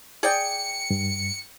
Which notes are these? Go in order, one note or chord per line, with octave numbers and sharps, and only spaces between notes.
G#4 D5 G5 C#7
G2